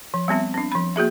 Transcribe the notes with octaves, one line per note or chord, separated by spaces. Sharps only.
F3
G3 B3 C4 E5
C4 D4
F3 B5
A#3 F#4 G#4 E5